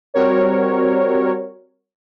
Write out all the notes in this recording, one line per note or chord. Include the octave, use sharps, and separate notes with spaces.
G3 C4 F#4 A#4 C#5